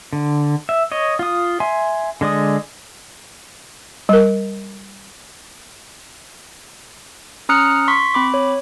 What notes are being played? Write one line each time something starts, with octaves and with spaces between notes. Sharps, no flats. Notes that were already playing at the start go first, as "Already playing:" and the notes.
D3
E5
C#5 D#5
F4 D#6
E5 G#5 C6
D3 G#3 D5 D#6
G3 A#4
C#4 A#5 D#6 F6 F#6 C#7
C6 C#6 B6
C4 B5 D6
C#5